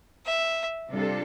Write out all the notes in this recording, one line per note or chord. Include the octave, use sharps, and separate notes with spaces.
E5
C3 G3 D4 F4 A4